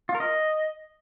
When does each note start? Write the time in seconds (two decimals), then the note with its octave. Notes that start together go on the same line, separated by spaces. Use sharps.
0.09 F4
0.15 A#4
0.20 D#5